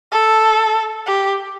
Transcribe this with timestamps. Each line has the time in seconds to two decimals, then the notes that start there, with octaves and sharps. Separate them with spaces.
0.12 A4
1.06 G4